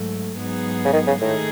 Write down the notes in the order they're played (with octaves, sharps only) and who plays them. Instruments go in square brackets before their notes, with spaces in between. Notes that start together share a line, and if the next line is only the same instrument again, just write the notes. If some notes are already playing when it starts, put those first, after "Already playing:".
Already playing: [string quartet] G#2 F#3 A3
G#2 F#3 B3 D#4 G#4
[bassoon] C#3
D#3
C#3
[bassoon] A2 [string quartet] D#3 A3 D#4 G#4